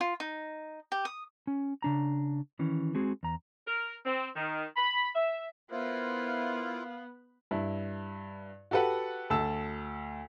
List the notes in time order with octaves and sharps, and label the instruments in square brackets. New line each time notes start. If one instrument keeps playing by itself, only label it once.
[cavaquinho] F4
D#4
G4
D#6
[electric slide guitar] C#4
C#3 D4 A#5
D#3 E3 C#4
G#3 C4 F#4 G#4
E2 A#5
[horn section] A#4
C4
D#3
B5
E5
[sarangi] B3 [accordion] E4 F4 [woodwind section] A#4 C5 F5
[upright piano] G2 E4
F#4 G4 A4 B4 F#5
D2 A5 E6